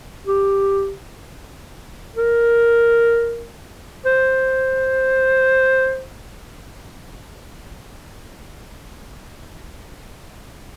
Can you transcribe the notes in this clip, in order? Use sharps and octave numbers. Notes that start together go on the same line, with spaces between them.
G4
A#4
C5